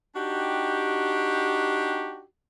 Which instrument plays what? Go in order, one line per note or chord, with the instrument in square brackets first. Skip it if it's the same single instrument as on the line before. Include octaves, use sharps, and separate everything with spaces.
[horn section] D4 D#4 F#4 G4